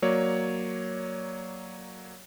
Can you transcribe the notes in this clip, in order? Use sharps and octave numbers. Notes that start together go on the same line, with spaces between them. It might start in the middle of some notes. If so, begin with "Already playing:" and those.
F#3 A#3 C#5 D5